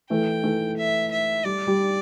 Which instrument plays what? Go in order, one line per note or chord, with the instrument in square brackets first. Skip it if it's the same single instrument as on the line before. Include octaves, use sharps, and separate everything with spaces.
[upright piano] E3 A3 [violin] G5
[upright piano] E3 A3
[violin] E5
E5
[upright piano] G3 [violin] D5
[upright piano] G3